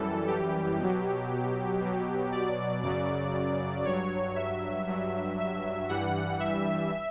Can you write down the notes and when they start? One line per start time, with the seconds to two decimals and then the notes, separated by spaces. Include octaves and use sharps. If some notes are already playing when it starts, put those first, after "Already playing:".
Already playing: F#2 E3 G3 A4
0.27 G4
0.79 B2 F#3
1.81 B2 F#3
2.32 D5
2.83 F#2 C#3 F#3 D5
3.85 G2 F#3 C#5
4.36 E5
4.87 G2 F#3
5.38 E5
5.89 G2 E3 G3 F#5
6.40 E5